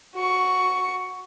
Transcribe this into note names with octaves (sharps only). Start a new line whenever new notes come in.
F#4 C#6